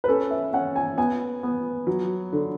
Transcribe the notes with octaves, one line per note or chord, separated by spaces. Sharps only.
B4
C#4 A4
E5
C#4 F#5
G#5
B3 G#5
B3
F#3
D3